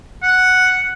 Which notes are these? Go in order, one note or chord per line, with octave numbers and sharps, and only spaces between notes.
F#5